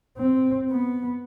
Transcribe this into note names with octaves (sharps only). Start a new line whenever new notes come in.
C4
B3